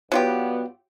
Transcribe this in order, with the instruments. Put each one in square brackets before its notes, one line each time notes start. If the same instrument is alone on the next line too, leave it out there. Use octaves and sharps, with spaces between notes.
[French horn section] G2 B3 [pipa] F#3 F4 G4